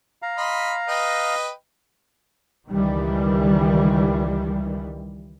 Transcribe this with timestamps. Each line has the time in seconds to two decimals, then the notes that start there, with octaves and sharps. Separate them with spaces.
0.22 F5 A#5
0.37 D#5 B5 C6
0.88 B4 D#5 G5
2.68 C#2 D#3 E3 G3